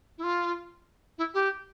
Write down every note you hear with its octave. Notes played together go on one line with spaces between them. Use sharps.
E4
F4
E4
G4